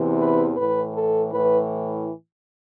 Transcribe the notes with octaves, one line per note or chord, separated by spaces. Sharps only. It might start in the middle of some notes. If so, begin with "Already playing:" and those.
Already playing: E2 C3 E3
B4
A2 E3 B4
A4
A2 E3 B4